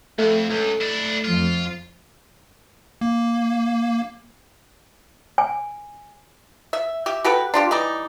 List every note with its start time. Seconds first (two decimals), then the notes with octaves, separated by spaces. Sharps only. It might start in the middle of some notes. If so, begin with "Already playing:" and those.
0.18 F2 A3
0.49 C#2
0.81 D4 E4
1.24 F2 F3 F4
3.01 A#3
5.38 G#5
6.73 E5
7.06 G4 E5
7.24 F#4 G4 A4 B4
7.54 D4 F4 G4
7.71 E3 G3 D#4 D5